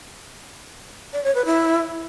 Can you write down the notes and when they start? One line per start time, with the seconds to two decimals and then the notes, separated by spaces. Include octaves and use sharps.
1.13 D5
1.24 C#5
1.35 B4
1.46 E4